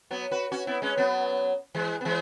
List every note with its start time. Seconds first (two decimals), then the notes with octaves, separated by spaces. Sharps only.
0.11 F#3 B3
0.31 F#4 B4
0.52 C#4 F#4
0.67 B3 E4
0.82 G#3 C#4
0.97 F#3 B3
1.74 E3 G#3
2.01 B3
2.05 E3 G#3